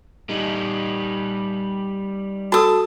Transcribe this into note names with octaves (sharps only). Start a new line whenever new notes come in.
G3 D#4
F#4 A4 A5 D#6 E6